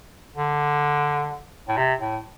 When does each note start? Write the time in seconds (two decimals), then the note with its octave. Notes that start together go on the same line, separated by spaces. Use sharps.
0.36 D3
1.68 A2
1.77 C3
2.01 A2